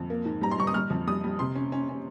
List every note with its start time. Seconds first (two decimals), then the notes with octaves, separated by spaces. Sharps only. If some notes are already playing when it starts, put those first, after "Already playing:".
Already playing: F2
0.10 A#3
0.25 G#2
0.41 G3 A#5
0.51 C6
0.58 G3 C#6
0.67 D#6
0.74 G3 F6
0.90 F2
1.07 G3 D#6
1.24 G3
1.39 C3 C6
1.55 C#4
1.72 C#4
1.89 C#4